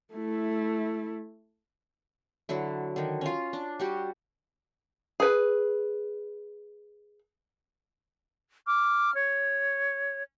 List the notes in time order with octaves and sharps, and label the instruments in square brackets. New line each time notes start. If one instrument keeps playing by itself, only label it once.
[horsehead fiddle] A3 E4
[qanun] D3 F#3 E4
D3 D#3
C#4 F4
D4
G3 F#4 G4
[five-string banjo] G#4 B4
[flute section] D6 F6
C#5